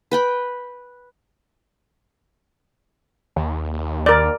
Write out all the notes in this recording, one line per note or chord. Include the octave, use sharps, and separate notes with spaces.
B4 G5 B5
D#2
A#4 D5